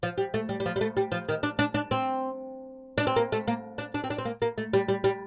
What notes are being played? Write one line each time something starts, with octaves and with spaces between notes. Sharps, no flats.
F3
G3
A3
G3
G3
F3
G3
A3
G3
F3
D#3
D4
D4
D4
C4
D4
C4
A#3
A3
A#3
D4
D4
C4
D4
C4
A#3
A#3
A3
G3
G3
G3